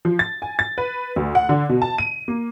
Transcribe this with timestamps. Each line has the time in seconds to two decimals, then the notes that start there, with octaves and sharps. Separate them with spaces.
0.05 F3
0.19 A6
0.42 G#5
0.59 A6
0.78 B4
1.16 D2
1.35 F#5
1.49 D3
1.69 B2
1.82 A5
1.98 D#7
2.28 A#3